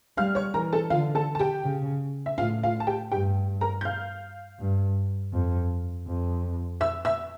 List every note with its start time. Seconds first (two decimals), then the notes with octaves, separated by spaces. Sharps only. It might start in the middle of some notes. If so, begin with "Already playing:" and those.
0.17 G3 F5 F6
0.35 C#5 C#6
0.54 E3 A#4 A#5
0.73 A4 A5
0.90 D3 F4 F5
1.15 A4 A5
1.35 A5
1.39 G4 G5
1.65 C#3
2.26 E5
2.38 A2 F4 F5
2.63 F4 F5
2.80 A5
2.87 G4 G5
3.12 G2 G4 G5
3.61 A#4 A#5
3.81 G6
3.85 F5 F6
4.59 G2
5.33 F2
6.07 F2
6.81 E5 E6
7.05 E5 E6